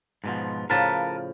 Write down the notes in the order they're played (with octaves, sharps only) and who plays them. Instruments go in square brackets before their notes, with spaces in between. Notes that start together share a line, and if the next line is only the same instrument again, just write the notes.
[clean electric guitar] G#2 B2 F3
[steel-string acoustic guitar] A2 C#3 F3 [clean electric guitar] A#4 B4 A5